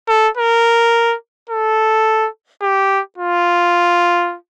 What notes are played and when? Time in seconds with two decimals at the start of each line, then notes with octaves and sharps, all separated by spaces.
0.09 A4
0.37 A#4
1.50 A4
2.62 G4
3.18 F4